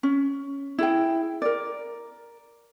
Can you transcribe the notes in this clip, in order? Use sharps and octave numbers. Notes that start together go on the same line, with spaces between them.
C#4
E4 G#4 G5
A#4 D5